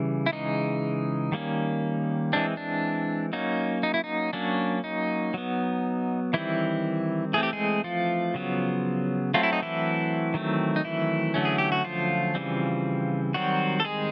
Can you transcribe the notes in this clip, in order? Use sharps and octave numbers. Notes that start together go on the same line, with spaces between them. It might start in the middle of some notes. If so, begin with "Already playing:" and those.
Already playing: C#3 E3 G3
E4
C#3 E3 G#3 D#4
D#3 G3 A#3 C#4
E3 G#3 C4 D4
D4
F#3 A#3 C#4 D#4
D#4
E4
D#4
F#3 A#3 C#4 D4
D#4
F#3 B3
D#3 E3 G3 C4 E4
E3 A3 C4 G#4
G4
G#3 G#4
F3 F4
C#3 F#3 B3
F#3 A3 C4 F4
E4
D#4
E3 E4
D#3 F#3 A3 C4
D#4
E3 E4
D3 F#3 A3 C#4
G#4
G4
F#4
F3 F4
C#3 E3 G3 C4
D#3 F#3 G3 C4 F#4
A4
G#3 G#4